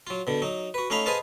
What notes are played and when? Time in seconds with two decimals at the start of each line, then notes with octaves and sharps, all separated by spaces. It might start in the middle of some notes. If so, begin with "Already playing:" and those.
0.07 F#3 F4
0.27 B2 D3
0.42 F#3 D#4
0.74 F#4 B4
0.90 A3 C#4 D#4 F5 A#5 B5
1.06 G#4 B4 C5 D#5 F5 A5